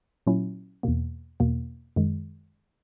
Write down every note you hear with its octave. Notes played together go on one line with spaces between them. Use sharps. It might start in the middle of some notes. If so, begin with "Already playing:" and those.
A#2 F#3 C#4 E4
E2 B2 A#3
E2 B2 A#3
F#2 D#3 G#3